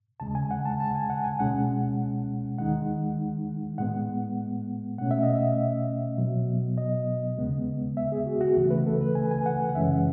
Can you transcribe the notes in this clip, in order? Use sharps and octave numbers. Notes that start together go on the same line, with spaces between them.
D#2 C#3 G#3 A5
G#5
F#5
A5
A5
G#5
F#5
G#5
C#2 B2 G#3 C#4 F#5
D#2 D#3 G#3 D#4 F#5
A2 G#3 B3 F#5
B2 A3 C#4 F#5
E5
D#5
E5
B2 F#3 B3
D#5
D#2 C#3 G#3 B3
E5
G#4
F#4
F#4
C#2 C#3 E3 A3
B4
A4
B4
G#5
G#5
F#5
F#5
F#2 C#3 E3 G#3 C#4 E5
F#5